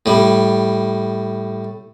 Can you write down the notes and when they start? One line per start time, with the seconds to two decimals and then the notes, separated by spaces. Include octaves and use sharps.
0.06 A2 G3